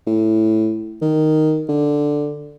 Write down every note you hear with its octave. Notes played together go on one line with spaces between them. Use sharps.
A2
D#3
D3